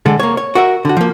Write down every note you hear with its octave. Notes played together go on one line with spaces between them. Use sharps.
D3 G#3 A4
A#3 C#5
C#5
F#4 A#4 E5
D3 F#4
F3 A#3